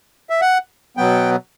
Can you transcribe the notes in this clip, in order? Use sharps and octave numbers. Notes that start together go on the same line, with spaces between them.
E5
F#5
B2 F#3 B3 G5